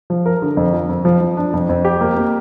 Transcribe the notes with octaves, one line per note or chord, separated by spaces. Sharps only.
F3
A#4
D3
F2
F3
F2
F3
F3
D4
F2
F2
G4
A#3
A#3